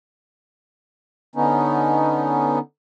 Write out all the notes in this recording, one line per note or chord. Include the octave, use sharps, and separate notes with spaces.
D3 B3 C#4 D#4